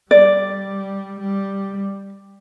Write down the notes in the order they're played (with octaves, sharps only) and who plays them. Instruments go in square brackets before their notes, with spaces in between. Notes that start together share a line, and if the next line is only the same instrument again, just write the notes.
[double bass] G3 [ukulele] D5
[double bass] G3